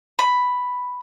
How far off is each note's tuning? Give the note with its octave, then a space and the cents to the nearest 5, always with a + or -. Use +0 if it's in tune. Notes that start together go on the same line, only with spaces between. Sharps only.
B5 +5